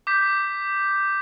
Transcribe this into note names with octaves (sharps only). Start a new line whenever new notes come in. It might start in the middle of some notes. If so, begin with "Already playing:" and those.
D6 G6 B6